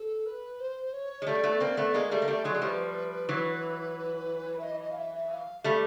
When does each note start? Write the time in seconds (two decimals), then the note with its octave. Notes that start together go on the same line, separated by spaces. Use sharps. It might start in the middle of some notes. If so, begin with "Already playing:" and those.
Already playing: A4
0.26 B4
0.60 C5
0.93 C#5
1.22 G#3
1.27 G3 A3 D5
1.44 A3 B3
1.60 A#3 C4
1.77 A3 B3
1.94 G#3 A#3
2.11 G3 A3
2.22 A#3
2.28 G3 A3
2.44 F#3 G#3
2.55 G#3
2.62 F3 G3 B4
3.29 E3 F#3
4.59 E5
4.63 D#5
4.81 D#5
4.91 F5
4.97 E5
5.14 E5
5.31 F5
5.64 G3 A3